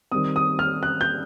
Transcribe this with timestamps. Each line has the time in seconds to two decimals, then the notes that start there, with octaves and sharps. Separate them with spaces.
0.12 D#3 G3 C4 D#6
0.36 D#6
0.59 F6
0.83 F#6
1.01 G6